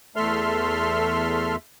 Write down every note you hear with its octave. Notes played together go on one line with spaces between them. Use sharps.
E2 A3 A4 E5 C6 F6